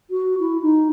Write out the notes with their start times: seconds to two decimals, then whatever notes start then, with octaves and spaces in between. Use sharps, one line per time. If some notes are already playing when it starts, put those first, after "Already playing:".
0.10 F#4
0.40 E4
0.62 D#4